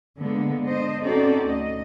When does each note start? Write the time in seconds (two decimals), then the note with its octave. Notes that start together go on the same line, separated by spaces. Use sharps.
0.18 D3 G#3 A#3 B3
0.65 D4 C5 D#5
1.03 C4 C#4 D#4 F#4 A4 D5
1.43 D2 D#5